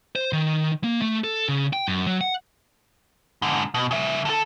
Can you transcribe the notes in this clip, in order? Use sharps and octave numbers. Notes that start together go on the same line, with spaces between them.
C5
D#3
A#3
A3
A4
C#3
G5
F#2
F#3
F#5
G#2 D3
B2
C#3 E5
D3 A4